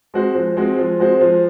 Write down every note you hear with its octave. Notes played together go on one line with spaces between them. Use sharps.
G#3 C4 F#4 C5
F3
G#3 C4 F#4 C5
F3
G#3 C4 F#4 C5
F3